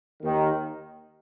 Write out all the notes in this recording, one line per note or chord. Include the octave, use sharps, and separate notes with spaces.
D#2 D#3